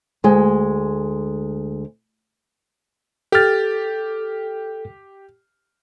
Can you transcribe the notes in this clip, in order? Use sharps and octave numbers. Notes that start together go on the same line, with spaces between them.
D2 G#3
G4 A4 F6 A6